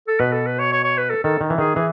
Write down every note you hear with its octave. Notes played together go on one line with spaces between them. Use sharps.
A4
B2 B4
A4
B4
C#5
C#5
C#5
B4
A4
D#3 A4
D#3
E3
D#3 G#4
E3 G#4